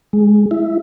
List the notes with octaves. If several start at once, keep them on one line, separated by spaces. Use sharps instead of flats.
G#3
E4